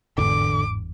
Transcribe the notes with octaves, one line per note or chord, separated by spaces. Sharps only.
G1 E2 G#2 D3 D4 D6